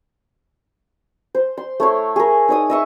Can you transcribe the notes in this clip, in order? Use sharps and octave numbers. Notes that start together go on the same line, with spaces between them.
C5
C6
A3 E4 C#5 C6
G#4 A#4
D#4 C#5 D#6
D#5 E5 C#6